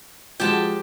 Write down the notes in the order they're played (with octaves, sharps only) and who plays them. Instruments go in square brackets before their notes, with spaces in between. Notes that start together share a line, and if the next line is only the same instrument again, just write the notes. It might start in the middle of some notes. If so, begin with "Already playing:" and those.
[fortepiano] F3 G#3 F#4 [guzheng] G4 A5